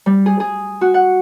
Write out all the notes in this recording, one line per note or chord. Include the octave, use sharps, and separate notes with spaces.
G3
G#4
G#4
F#4
F#5